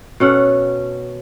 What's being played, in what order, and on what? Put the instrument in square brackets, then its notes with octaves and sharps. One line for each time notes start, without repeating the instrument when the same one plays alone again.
[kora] B2 C#4 A4 F#5